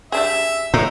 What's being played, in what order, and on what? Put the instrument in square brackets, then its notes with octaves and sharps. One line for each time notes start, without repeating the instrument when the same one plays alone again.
[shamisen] G3 D4 G#4 [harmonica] E5
[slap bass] A2 [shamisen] D#4